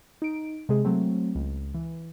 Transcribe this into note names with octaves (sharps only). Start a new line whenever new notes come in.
D#4 D7
C3 G#3 G#4
F#3 A3 C4
C#2
E3